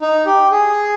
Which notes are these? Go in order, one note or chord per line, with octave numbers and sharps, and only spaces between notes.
D#4
G4
G#4